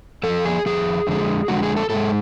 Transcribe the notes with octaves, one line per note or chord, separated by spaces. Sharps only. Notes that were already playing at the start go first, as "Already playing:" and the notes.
F2 F3 A4
G#4
F2 F3 G#4
F2 D3 G#3
F2 D3 G#3 F#4
G#4
A4
G#2 G#3 A4